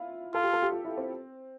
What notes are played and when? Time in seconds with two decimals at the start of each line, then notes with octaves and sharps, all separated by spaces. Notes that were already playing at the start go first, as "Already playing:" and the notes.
Already playing: E4 F4
0.34 F4 A4
0.44 G4
0.53 A4
0.63 G4
0.72 F4
0.85 E4
0.97 C4